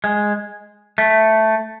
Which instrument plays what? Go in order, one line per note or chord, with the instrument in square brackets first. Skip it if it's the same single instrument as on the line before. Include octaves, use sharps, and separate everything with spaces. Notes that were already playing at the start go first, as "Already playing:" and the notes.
[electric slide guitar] G#3
A3